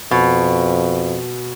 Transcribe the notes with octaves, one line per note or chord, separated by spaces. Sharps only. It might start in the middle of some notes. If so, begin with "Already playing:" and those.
F2 B2